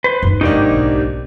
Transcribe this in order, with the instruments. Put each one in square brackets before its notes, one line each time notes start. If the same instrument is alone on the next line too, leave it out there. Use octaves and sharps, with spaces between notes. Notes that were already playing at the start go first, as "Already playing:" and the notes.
[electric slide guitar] B4 C5
[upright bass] F#2 D#4
[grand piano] G#1 A#3 D4 [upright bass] C3 [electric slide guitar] D#4 G4
[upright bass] B1